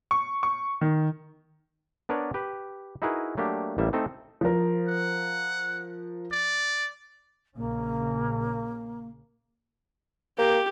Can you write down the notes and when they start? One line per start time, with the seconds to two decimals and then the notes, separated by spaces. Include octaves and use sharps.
0.11 C#6
0.43 C#6
0.81 D#3
2.09 B3 D4 A#4 B4 C#5 D5
2.34 G4 B4
3.02 D#4 E4 F#4 G#4 A#4 B4
3.37 F#3 A3 A#3 D4 G4
3.78 A1 G3 A#3 E5
3.93 A3 C4 D#4 A4
4.41 F3 A#4
4.88 F#5
6.32 D5
7.57 A#1 C#3 A#3 C#4
10.38 A#3 G4